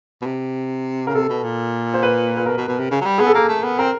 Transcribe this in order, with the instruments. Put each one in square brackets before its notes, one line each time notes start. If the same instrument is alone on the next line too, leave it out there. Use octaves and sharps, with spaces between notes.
[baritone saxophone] B2
C3
[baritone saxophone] C#3 [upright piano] A#4
[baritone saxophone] C3 [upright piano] A4
[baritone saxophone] B2
A#2
[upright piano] C5
B4
B4
[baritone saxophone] B2 [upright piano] A#4
[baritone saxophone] B2
B2
C3
C#3
F#3
G3
[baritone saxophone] B3 [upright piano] G#4
[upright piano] A4
[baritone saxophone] A#3 [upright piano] A#4
[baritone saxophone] A3
B3
[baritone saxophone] C4 [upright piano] A#4